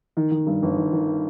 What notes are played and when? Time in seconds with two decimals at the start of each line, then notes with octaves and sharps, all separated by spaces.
0.17 D#3
0.31 D#3
0.47 G2
0.63 G1
0.77 D#3
0.93 D#3